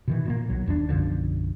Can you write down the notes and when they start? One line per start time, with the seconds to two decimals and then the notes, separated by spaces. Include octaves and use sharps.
0.08 B2 D#3 E3
0.25 A#2 A3 A#3
0.49 B1 F#3
0.66 E1 D#2 E3 D4
0.89 B1 F#2 D3 F3